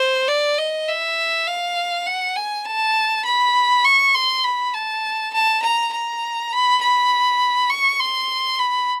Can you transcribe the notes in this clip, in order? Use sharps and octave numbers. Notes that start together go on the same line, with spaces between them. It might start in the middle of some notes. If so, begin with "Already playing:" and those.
Already playing: C5
D5
D#5
E5
F5
F#5
G#5
A5
B5
C#6
C6
B5
A5
A5
A#5
A#5
B5
B5
C#6
C6
B5